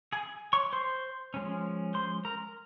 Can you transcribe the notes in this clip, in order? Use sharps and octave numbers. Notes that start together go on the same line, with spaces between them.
G#4 G#5
C#5 C#6
C5 C6
F3 G#3 C#4
C5 C6
A#4 A#5